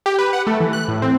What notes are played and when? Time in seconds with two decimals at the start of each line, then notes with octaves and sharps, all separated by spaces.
0.06 G4
0.19 B4
0.33 F#5
0.47 A3
0.60 E3
0.73 F#6
0.88 A2
1.02 C4